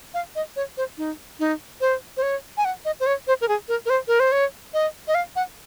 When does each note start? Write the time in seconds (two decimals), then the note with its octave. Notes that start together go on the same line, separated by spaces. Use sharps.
0.14 F5
0.35 D#5
0.56 C#5
0.77 C5
0.98 D#4
1.39 D#4
1.81 C5
2.17 C5
2.23 C#5
2.57 G#5
2.65 F#5
2.85 D#5
3.00 C5
3.06 C#5
3.27 C5
3.41 A#4
3.48 G#4
3.68 A#4
3.86 A#4
3.90 C5
4.08 A#4
4.20 C5
4.32 C#5
4.74 D#5
5.08 D#5
5.15 F5
5.36 F#5